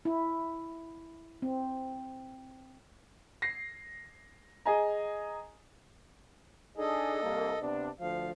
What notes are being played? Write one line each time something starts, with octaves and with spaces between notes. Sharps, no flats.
E4
C4
A#6 C7
G#4 D#5 G#5 A#5
D4 D#4 G#4 A4 D#5
C2 A#3
C3 B3 D4
D2 F3 F5